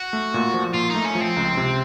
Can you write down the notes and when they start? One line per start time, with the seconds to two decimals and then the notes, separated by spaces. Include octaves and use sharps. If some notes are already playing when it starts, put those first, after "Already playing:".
Already playing: F#4
0.13 A3
0.34 A#2
0.54 F3
0.74 A#2 F4
0.90 A3 D#4
1.05 C#4
1.15 F3
1.21 C4
1.36 C#2
1.57 C3